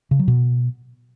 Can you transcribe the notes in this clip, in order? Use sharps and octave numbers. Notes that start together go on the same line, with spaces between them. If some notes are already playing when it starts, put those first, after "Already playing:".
C#3
F#3
B2